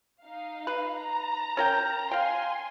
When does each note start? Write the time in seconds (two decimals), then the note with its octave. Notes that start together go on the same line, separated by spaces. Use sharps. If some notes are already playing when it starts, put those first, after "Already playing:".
0.22 D#4 F5
0.67 B4
0.97 A#5
1.57 C#4 A#4 G5
2.11 F5 G5 G#5 C6